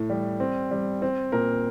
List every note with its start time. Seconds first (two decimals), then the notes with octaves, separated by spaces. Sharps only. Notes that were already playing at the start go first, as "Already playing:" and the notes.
Already playing: A2
0.10 G3
0.40 C4
0.71 G3
1.02 C4
1.32 A#2 A#4